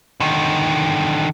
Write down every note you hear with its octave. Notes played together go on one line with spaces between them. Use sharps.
D3 D#3